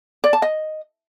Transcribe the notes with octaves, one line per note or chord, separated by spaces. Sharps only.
D5
A5
D#5